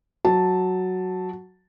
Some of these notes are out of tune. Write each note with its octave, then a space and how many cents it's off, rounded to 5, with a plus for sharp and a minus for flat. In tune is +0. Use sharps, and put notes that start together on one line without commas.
F#3 +0 A5 +0